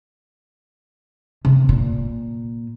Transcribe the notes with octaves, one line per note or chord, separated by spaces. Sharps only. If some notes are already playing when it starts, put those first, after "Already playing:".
C3
A#2